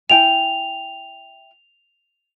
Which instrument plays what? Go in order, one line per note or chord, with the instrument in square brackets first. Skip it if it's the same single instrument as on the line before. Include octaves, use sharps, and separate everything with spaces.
[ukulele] E4 G5 G#5 [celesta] F7